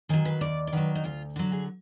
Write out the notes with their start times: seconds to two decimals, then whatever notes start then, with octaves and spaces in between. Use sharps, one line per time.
0.09 D#3 F#3 G#5
0.25 B4
0.41 D#2 D5
0.67 D5
0.73 D#3 F#3 B4
0.95 D#4
1.04 D2 F4
1.36 D3 F#3 F#4
1.52 G#4